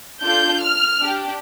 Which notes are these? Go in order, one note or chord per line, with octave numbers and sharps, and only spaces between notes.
D4 F4 A4 G6
F6
D4 G4